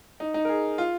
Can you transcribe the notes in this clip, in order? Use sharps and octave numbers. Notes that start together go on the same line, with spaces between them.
D#4
D#4
A#4
G#4
F4